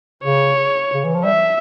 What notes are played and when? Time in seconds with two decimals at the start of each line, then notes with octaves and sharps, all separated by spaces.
0.23 C#3 C#5
0.94 C#3
1.05 E3
1.14 F3
1.24 G3 E5